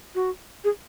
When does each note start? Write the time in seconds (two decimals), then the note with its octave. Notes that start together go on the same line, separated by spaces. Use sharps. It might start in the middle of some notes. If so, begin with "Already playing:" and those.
0.15 F#4
0.64 G#4